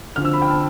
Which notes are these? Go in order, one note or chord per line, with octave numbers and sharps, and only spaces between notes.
D2 D3 F3 C4 F6
E6
B5
G5
A5